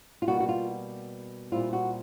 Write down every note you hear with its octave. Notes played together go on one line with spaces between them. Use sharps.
F4
B2 G3 A#3 F#4
F#4
F4
A#2 G3 C4 E4 F4
F#4